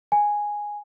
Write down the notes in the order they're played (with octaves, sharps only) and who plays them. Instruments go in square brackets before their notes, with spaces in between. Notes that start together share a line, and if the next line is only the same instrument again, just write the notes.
[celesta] G#5